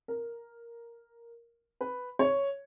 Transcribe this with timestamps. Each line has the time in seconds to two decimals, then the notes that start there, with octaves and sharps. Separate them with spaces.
0.08 A#4
1.81 B4
2.19 C#5